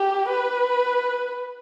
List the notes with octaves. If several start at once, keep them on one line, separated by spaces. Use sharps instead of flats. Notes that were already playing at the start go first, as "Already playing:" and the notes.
Already playing: G4
B4